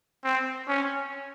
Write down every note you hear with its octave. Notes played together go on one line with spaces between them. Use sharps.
C4
C#4